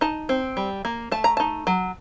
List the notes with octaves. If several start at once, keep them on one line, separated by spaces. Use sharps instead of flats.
D#4 A5
C4
G3
A#3
A3 A5
A#5
D#4 A5
F#3